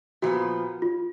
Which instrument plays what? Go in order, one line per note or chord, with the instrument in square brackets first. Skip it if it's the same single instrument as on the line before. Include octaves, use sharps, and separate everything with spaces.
[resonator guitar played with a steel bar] A#2 F3 B3 [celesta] F#4
[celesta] F4